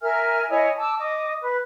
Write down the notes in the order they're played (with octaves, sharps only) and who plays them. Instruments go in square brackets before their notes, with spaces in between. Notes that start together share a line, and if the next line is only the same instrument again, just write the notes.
[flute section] A#4 E5 G#5 F6
E4 C#5 D#5 G#5
A5 D6 E6
D#5 D6
B4